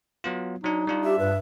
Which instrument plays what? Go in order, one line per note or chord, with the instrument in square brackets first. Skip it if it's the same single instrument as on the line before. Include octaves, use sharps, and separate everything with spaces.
[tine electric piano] F#3 B3 F4
[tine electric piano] F#3 D4 [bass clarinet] D#4
[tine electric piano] G3 D4 F4
[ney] G4 [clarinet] E5
[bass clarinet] G2 [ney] B4